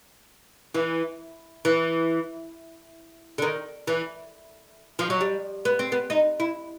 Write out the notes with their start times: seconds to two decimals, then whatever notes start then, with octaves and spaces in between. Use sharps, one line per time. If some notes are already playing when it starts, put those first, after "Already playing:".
0.74 E3
1.65 E3
3.38 D3
3.42 D#3
3.87 E3
4.99 F3
5.10 F#3
5.21 G3
5.65 B3
5.79 C4
5.92 B3
6.10 D#4
6.40 E4